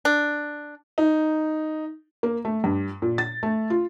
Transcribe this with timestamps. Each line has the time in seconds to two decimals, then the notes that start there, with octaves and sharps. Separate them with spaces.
0.05 D4
0.98 D#4
2.23 A#3
2.45 A3
2.64 G2
3.02 A#2
3.18 A6
3.43 A3
3.70 F4